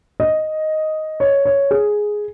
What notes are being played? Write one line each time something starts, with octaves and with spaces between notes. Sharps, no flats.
D#5
C#5
C#5
G#4